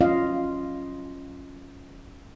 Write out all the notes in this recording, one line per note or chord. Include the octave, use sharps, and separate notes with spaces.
F#3 C#4 F4 D#5 F5